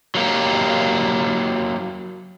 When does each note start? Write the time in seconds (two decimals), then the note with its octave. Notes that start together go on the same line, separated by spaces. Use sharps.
0.15 F#3 A#3 G4